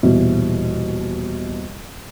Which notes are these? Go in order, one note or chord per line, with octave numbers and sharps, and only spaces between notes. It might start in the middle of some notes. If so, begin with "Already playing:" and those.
D#1 B2 E3